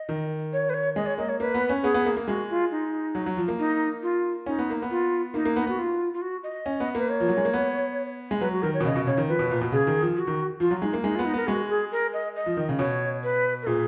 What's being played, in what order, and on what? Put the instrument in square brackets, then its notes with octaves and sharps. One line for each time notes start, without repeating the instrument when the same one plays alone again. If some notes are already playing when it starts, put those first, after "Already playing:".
Already playing: [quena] D#5
[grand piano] D#3
[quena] C#5
B4
C#5
[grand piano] G#3 [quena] D#5
[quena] C#5
[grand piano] A#3 [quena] D#5
[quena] C#5
[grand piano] A#3 [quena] B4
[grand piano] B3
C#4
[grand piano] B3 [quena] G#4
[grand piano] B3
A#3
A#3
[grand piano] G#3 [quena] F#4
[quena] F4
D#4
[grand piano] F#3
F#3
F3
A#3
[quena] D#4
F4
[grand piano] C#4 [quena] D#4
[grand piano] B3
A#3
B3
[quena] F4
[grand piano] A#3 [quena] D#4
[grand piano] A#3
B3
[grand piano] B3 [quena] F#4
[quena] F4
F4
F#4
D#5
[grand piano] C#4
B3
[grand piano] A#3 [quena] B4
[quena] C#5
[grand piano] F3
F#3
G#3
A#3
B3
G#3
[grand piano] F#3 [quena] B4
[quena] F#4
[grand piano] D#3 [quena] A#4
[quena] C#5
[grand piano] B2
[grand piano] C#3 [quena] D#5
[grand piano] B2
[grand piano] C#3 [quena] C#5
[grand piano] D#3
[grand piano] F3 [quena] B4
[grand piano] B2
A#2
B2
[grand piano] C#3 [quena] G#4
[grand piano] D#3
F3
[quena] F#4
[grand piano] D#3
[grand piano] F3 [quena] F4
[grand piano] F#3
[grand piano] G#3 [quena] D#4
[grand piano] A#3
[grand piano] G#3 [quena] D#4
[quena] F4
[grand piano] B3
[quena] D#4
[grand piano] B3 [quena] A#4
[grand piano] G#3 [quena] F#4
[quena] G#4
A#4
D#5
D#5
[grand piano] F3
D#3
C#3
[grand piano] B2 [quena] C#5
[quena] B4
A#4
[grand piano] A#2 [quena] G#4